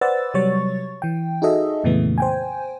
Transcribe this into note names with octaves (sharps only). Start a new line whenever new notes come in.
B4 C5 D5 F#5 E6 A6
C3 F#3 G3 C#5 C#6 A6
E3 G5
D#4 F#4 G#4 A4 D#5 E5
F2 A#2 C#3 E3 A3 B3
C5 G5 G#5